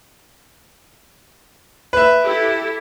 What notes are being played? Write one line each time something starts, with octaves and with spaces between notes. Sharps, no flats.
B4 E5
E4 G4 A4